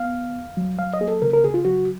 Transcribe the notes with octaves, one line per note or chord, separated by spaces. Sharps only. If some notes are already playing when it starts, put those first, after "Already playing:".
Already playing: B3 F5
D2
E2
F#3
F#3 F5
D#5
A#3 G#4
A4
C#3 A#4
A#4
C#3 G#4
F4
F#3 F#4